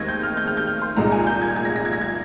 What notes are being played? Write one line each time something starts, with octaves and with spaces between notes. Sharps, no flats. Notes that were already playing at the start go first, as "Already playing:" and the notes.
Already playing: D#2 D#3 G#3 C4 D#4 G#6 A#6
G6
F6
G6
F6
G6
F6
C6
C2 A#2 G#3 D#4 A#5
G#5
G6
G#6
G#6
A#6
A#6
G#6
A#6
G#6